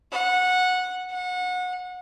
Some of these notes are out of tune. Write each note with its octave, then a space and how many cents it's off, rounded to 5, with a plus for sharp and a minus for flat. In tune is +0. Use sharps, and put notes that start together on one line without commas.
F#5 -15
F#5 -30